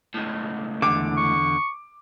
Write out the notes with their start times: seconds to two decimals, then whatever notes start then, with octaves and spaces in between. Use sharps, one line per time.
0.14 C#2 A2
0.82 E2 D3 D6
1.17 C#6